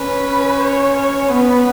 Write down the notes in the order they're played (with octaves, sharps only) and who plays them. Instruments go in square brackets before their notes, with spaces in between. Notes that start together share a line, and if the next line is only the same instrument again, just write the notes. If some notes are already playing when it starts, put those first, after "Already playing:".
Already playing: [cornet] C#4 [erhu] B4
[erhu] C#5
C#5
[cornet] B3 [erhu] B4